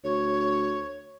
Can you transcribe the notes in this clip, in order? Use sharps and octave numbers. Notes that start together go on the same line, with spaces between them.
D2 C#5